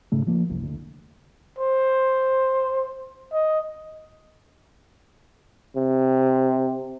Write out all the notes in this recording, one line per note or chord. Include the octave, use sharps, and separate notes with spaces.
G#2 C#3 A3
F3 A#3
F#1 C2
D2
C5
D#5
C3